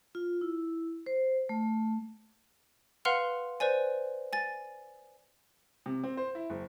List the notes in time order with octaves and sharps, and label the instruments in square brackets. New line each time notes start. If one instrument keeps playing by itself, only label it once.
[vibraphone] F4
E4
C5
A3
[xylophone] B4 F5 F#5 C6 F6 F7
B4 C5 D5 G#5
G#5 A6
[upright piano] C3
C4
C5
E4
F#1